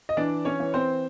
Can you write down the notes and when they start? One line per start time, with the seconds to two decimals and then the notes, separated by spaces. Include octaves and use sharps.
0.09 D#5
0.17 E3 D4 D5
0.45 C#4 C#5
0.60 E3
0.74 C4 C5